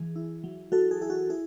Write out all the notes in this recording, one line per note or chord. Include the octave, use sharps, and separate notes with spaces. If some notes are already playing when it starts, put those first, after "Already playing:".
Already playing: E3 G#4
E4
F#3
F#3 F#4 A4
G#4
E4 G#4
F#4
E4 G#4